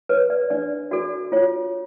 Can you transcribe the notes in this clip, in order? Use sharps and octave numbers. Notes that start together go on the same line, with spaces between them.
B4 C#5
D5
D4 D5
F#4 A4 D5
F4 C#5